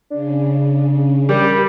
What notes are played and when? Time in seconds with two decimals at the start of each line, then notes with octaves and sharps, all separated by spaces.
0.11 C#3 D4
1.29 G3 A#4